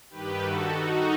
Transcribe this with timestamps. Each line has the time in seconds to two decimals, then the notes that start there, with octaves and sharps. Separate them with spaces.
0.10 G2 D#3 G4 B4
0.41 F#4 A4
0.72 D#4 F#4